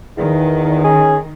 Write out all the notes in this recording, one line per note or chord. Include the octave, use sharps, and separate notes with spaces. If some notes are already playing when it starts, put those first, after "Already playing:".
E2 D#3
C#4 G#4